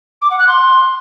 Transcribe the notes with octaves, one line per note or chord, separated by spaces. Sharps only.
D6
F#5
F#6
C6